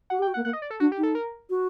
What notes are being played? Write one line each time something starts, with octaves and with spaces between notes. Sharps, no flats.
F#4 F#5
G4
G5
F#4
A#3 F#5
A#3 F#5
D#5
D5
A4
D4 F#4
G4
D#4
A4
A#4
F#4